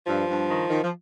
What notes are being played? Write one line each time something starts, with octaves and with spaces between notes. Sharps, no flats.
G2 F3
G2
D#3
D#3
F3